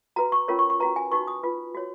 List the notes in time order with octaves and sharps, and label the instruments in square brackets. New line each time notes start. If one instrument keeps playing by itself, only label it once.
[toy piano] F#4 B4 A#5
C#6
C#4 F4 A#4 C#5
C#6
C#6
C#4 F#4 B4 A#5
G#5
D#4 F#4 B4 C#6
D#6
F4 B4
F#4 C#5